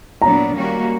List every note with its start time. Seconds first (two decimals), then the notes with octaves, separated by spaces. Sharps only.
0.22 A#2 F#3 B3 D4 A#5
0.54 D#3 G3 A#3 C#4 F#4